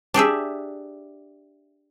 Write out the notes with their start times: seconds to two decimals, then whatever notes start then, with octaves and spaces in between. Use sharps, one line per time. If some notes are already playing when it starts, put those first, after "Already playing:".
0.14 D4 G4 G#4 E5